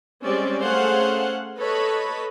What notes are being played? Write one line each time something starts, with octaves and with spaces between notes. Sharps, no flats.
G3 G#3 C4 C#4 D5
A3 C#4 G#4 C5 F5 F#5
A4 B4 C#5 D#5 A5 B5